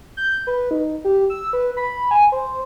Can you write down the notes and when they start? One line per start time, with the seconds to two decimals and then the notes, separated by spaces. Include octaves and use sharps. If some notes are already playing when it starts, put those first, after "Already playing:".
0.17 G6
0.47 B4
0.71 D#4
1.04 G4
1.30 E6
1.53 B4
1.77 B5
2.11 G#5
2.32 C5